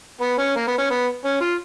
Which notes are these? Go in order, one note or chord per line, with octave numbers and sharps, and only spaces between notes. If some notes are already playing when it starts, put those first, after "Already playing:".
B3
C#4
A#3
B3
C#4
B3
C#4
F4